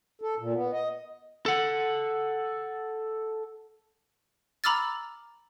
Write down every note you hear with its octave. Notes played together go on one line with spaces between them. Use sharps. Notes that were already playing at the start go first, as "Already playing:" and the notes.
A4
A#2
B3
D#5
A4 F#5
A#5 B5 D6 E6 F6 A6